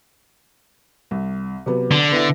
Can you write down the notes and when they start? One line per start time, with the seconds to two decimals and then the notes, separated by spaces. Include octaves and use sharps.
1.11 C2
1.66 C3 F#3 B3
1.91 D3
2.12 B3 E4 A#6